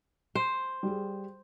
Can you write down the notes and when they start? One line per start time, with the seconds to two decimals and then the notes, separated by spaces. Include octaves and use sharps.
0.35 C5
0.83 G3 G#4